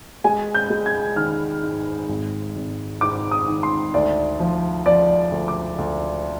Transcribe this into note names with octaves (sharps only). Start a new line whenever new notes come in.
G#3 G#5
G6
G#3
G#6
D#3 F6
G#2
G#1
G#1
G#2 D6
D#6
D#3
C6
D2 D5
F3
F3 D5
D2
D6
D2